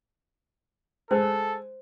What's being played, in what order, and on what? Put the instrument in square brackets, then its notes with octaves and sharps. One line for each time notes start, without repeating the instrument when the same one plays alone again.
[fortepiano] G#3 [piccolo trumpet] A4 [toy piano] C5